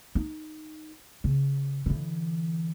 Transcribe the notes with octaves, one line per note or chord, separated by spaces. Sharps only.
D#4
C#3
D3 E3